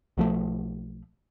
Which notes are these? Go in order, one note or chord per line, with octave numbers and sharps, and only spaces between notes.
B1 F3 A3